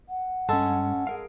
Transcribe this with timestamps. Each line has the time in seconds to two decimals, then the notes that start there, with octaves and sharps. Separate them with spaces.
0.09 F#5
0.49 G2 G#3 C#4 A4 A5
1.07 G#4 A#4 F5